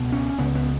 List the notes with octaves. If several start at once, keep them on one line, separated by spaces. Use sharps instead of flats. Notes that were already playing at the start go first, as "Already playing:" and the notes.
Already playing: C#2 B2
C#4
C#2 C#3 B3
B3